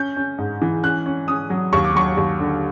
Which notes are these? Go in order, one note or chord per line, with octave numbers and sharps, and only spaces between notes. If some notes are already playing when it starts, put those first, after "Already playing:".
Already playing: C#4 G6
C#4
G#2
E3
C#4 F#6
C#4
C#4 D#6
F#3
D#2 C#6
D6
F#3 C#6
D#2
D3